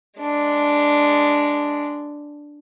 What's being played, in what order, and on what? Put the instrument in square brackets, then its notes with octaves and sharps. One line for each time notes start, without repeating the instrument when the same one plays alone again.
[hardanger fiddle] G#3 D4